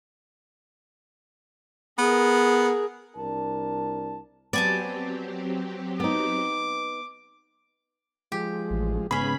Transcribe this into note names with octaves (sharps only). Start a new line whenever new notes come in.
B3 G#4 A#4
C2 D4 A#4 A5
F#3 B3 C4 G4 D5 G#5 A5
B3 D#4 D6
F3 G#3 G4
A1
G#2 C#3 B3 C#4 G#4 B5